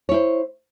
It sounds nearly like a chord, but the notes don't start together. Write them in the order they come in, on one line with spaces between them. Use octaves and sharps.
C#5 E4 C5